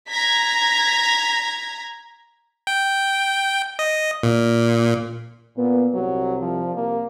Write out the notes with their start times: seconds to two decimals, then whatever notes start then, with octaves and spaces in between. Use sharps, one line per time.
0.11 A#5 G#6 A#6 B6
2.67 G5
3.79 D#5
4.23 A#2
5.58 A#2 B3
5.94 C2 F#3
6.40 F3
6.75 C2 A#3